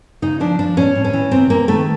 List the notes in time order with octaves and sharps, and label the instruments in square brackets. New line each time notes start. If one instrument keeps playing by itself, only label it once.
[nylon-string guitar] C#3 D#4
F3 D4
F3 D4
A2 C#4
A2
C#4
E3
C3 C4
C3 A#3
D#3 A3